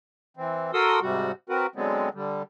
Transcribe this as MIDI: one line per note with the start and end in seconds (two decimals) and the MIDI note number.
0.37 0.71 52
0.37 0.71 60
0.74 1.00 66
0.74 1.00 69
0.74 1.00 70
0.74 1.00 84
0.74 1.00 87
0.74 1.00 88
1.02 1.32 44
1.02 1.32 48
1.02 1.32 55
1.02 1.32 66
1.49 1.67 60
1.49 1.67 66
1.49 1.67 70
1.49 1.67 71
1.76 2.09 50
1.76 2.09 54
1.76 2.09 56
1.76 2.09 59
1.76 2.09 60
2.14 2.43 50
2.14 2.43 55